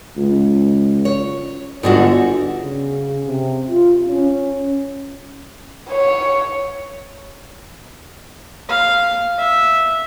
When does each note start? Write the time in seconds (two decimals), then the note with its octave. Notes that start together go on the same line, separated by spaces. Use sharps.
0.17 C#2
1.05 C#5
1.83 G1 G#2 D3 F#4
2.58 C#3
3.27 C3
3.70 F4
4.08 C#4
5.90 C#5
8.69 F5
9.39 E5